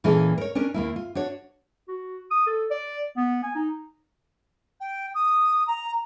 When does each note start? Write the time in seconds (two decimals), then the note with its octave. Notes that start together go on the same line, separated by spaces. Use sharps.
0.04 A#2 E3 A#3 C#4 G#4 A4
0.38 A#4 C#5
0.55 C#4 D4 A#4
0.74 D#2 A#3 E4
0.96 F4
1.15 D4 F#4 C#5
1.88 F#4
2.31 D#6
2.47 A4
2.71 D5
3.17 B3
3.43 G#5
3.55 D#4
4.80 G5
5.14 D#6
5.67 A#5